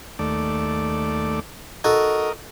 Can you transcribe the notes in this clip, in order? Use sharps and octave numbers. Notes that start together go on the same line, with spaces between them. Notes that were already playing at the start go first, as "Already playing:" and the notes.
D#2 A3 D5
D#4 F#4 A4 A#4 D#5